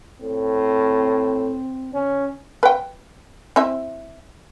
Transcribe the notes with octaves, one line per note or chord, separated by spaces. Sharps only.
A2 C4
C#3 C#4
B4 G5
C4 E4 E5